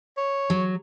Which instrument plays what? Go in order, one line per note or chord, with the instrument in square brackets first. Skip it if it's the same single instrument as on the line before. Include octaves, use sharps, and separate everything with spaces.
[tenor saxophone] C#5
[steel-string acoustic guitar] F#3